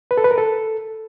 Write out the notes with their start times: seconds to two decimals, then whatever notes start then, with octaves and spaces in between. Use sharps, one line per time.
0.11 B4
0.18 A4
0.24 B4
0.31 A#4
0.38 A4